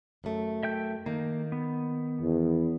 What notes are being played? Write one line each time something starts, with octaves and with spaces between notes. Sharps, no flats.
F#2 A3
E5 G5 G6
D#3 A#3
B3
E2